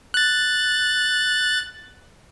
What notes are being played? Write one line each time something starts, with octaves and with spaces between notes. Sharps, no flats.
F#6 A6